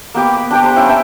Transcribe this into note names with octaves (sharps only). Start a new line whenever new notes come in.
A#3 B3 G4
B5
D4 G4 G5
C5 A#5
C#4 E4 F5
E5 G5 A5